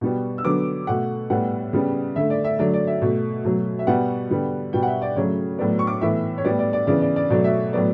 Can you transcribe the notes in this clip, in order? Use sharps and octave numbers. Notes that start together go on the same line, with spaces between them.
B2 G3 B3
E6
D3 F#3 B3 D6
B2 A3 F#5
A2 G3 B3 F#5
C#3 G3 B3
D3 A3 E5
D5
E5
D3 F#3 A3 D5
D5
E5
B2 A3
B2 F#3 A3
E5
B2 G3 B3 F#5
D3 G3 B3
B2 G3 B3 G5
F#5
E5
D5
C#3 F#3 A3 C#5
A2 F#3 B3 D5
C#6
D6
A2 E3 B3 E5
C#5
A2 G3 B3 D5
D5
D5
C#3 E3 B3 D5
D5
D5
B2 F#3 A3 D5
E5
A2 F#3 B3 D5